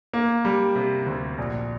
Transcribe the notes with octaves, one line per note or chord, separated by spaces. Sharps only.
A#3
G3
C3
D2
A#1